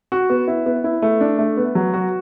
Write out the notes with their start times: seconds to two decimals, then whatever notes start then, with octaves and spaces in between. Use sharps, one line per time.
0.12 F#4
0.30 B3
0.48 E4
0.66 B3
0.84 E4
1.02 A3
1.21 D4
1.39 A3
1.57 B3
1.75 F#3
1.93 F#4